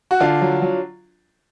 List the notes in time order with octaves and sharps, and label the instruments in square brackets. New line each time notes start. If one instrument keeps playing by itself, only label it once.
[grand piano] F#4
D3 D4 F4
F#3
F#3